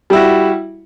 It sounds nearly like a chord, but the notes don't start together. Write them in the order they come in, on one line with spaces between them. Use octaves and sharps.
G3 E4 F#4